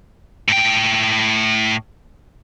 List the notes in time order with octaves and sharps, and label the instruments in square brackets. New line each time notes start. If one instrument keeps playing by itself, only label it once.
[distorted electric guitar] A2 G5